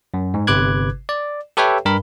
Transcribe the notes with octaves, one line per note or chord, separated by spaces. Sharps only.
F#2
G#2
G1 C3 B4 D6 F#6 G#6
D5
G4 A4 B4 C#5 E5 G5
G2 A#4 B5